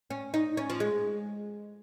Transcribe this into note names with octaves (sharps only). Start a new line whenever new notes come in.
C#4
D#4
C#4
F3
G#3